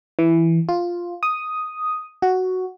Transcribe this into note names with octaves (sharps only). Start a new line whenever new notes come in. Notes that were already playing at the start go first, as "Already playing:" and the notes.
E3
F4
D#6
F#4